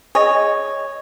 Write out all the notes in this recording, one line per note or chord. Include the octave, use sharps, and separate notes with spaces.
G#4 C#5 D#5